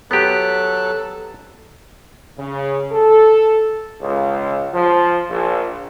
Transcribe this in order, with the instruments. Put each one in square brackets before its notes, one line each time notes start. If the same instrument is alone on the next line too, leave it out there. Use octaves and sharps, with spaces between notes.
[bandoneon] F#3 F#6 [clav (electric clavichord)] B3 G4 [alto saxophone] A4
[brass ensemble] C#3
A4
[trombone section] C#2
F3
A#1